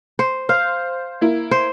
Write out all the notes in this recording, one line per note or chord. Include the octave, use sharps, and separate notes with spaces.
C5
C5 F5
A#3 E4
C5